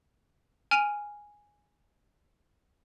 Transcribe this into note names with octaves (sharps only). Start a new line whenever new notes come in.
G#5 F6 D7 D#7 F7